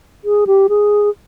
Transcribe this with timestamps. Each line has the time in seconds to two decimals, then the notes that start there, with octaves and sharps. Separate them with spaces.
0.25 G#4
0.47 G4
0.69 G#4